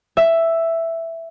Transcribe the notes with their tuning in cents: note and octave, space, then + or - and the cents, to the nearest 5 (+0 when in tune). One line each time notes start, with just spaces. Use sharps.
E5 +5